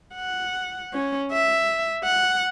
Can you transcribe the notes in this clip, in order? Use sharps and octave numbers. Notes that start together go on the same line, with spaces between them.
F#5
C#4
E5
F#5